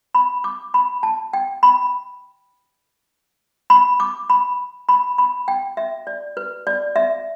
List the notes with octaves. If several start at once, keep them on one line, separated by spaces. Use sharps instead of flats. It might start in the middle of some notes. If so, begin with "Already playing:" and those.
B5
D6
B5
A5
G5
B5
B5
D6
B5
B5
B5
G5
E5
D5
B4
D5
E5